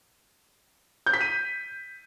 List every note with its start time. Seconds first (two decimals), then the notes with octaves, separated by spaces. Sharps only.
1.06 G6
1.14 B6
1.21 D#7